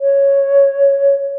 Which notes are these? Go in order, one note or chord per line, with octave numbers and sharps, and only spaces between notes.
C#5